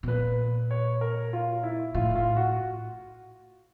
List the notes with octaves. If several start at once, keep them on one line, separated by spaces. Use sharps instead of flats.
B2
A#2 B4
C#5
A#4
F4
E4
A2 F4
F4
F#4